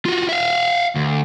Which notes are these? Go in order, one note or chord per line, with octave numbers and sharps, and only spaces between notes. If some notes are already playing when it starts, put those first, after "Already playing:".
F4 F#4
E5 F5
D2